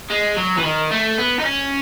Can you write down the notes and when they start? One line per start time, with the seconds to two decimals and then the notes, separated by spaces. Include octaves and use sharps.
0.10 G#3
0.37 F#3
0.58 E3
0.64 D#3
0.91 A3
1.18 B3
1.40 D#4
1.45 C#4